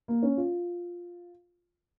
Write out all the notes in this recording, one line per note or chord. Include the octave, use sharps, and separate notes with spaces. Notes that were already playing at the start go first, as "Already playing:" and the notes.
A#3
C#4
F4